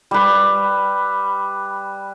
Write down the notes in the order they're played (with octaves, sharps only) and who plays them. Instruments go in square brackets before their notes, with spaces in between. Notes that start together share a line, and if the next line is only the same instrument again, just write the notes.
[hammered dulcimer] G3 B4